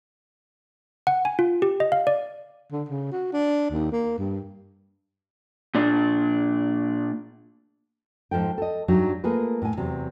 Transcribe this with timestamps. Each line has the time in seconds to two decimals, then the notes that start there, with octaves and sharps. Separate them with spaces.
1.07 F#5
1.25 G#5
1.39 F4
1.62 G4
1.80 D#5
1.92 F5
2.07 D5
2.72 D3
2.89 C#3
3.12 F#4
3.33 D4
3.71 D#2
3.92 A#3
4.18 G2
5.75 A#2 D4
8.31 G#2 F3 A4 G5
8.58 A4 D#5
8.88 G2 F#3 G3 D4 D#4
9.24 A3 A#3 F4 G#4 A4 B4
9.62 A2 G#5
9.77 E2 C3 F#3